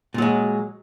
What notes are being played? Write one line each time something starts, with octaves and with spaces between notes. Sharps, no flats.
A#2 F#3 G#3